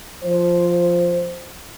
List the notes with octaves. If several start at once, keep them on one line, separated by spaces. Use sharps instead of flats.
F3 C5